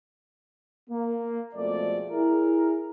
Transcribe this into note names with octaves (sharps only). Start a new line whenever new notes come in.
A#3
F2 B2 G#3 A3 D5
E4 G#4 A#4